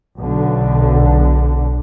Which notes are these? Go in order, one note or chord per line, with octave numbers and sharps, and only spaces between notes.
B1 D3